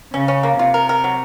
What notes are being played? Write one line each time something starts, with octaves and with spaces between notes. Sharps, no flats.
C#3 C#4
C#4
A#3
C3 F4
A#4
A#4
F#3